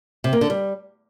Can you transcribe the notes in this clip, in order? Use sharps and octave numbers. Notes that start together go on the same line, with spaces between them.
C3
A#3
D3
G3